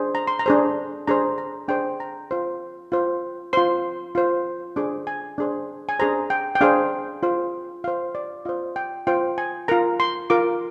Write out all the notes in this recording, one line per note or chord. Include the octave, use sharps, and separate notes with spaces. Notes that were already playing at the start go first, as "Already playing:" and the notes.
Already playing: D4 G#4 C5
A#5
C6
A#5
D4 G#4 C5
D4 G#4 C5 A#5
A#5
D4 G#4 C5 G5
A#5
F4 C5
F4 C5
F4 C5 C6
F4 C5
D4 G#4 C5 D6
G#5
D4 G#4 C5
G#5
D4 G#4 C5 A#5
G5
G5
D4 G#4 C5 F5
F4 C5
F4 C5 F5
D5
F4 C5 D#5
G5
F4 C5 G5
G#5
F4 A#4 A#5
C6
F4 A#4 D6